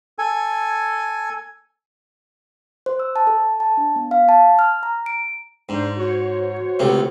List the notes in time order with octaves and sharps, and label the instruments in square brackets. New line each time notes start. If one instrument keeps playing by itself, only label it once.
[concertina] A4 G#5
[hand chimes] C5
E6
A5
A4
A5
D4
B3
F5
A5
F6
A#5
D7
[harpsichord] G#2 [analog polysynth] D4 C5
[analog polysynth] F#4 C5 C#5
[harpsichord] C#2 C3 A3